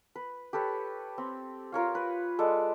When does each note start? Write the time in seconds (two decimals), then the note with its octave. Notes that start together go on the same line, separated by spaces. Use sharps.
0.16 B4
0.53 G4 A4 B4 C#5
1.18 C4
1.72 F4 A#4 C#5 F5
1.95 B4
2.39 G#3 A4 D5